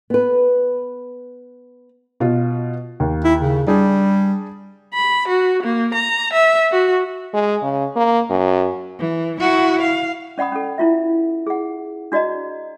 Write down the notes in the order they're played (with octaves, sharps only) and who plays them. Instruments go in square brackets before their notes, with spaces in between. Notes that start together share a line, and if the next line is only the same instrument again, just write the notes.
[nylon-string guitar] B3 B4
[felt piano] B2 F4
D#2
[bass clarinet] E4
C#3
[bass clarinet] G3 [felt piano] D4 G#4
[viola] B5
F#4
A#3
A#5
E5
F#4
[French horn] G#3
C#3
A#3
F#2
[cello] E3
E4 F#4
F5
[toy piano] C#4 D5 F#5 B5 D#6
C#4 A4
E4 F4 E5
G#4 F#5
D4 F#4 D5 D#5 A#5